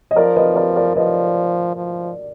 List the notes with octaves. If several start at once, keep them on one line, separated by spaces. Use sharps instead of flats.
D#5
F3 A#4 D5
B4 D#5
A#4 D5
A#4 D5
F3 B4 D#5
F3